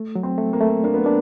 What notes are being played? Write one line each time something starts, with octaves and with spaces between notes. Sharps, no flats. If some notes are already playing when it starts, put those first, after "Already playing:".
Already playing: A3
F#3
C4
A3
A#3
A3
A#3 D4
B3
A#3 D4